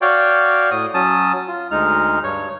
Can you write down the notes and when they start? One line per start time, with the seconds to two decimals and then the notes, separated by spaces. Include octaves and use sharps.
0.02 F#4 C#5 D5 F5 G5
0.71 A2 D#6
0.94 F#3 C#4 A5 D#6
1.48 F4
1.71 D2 G#3 D#4 F6
2.24 G2 C#5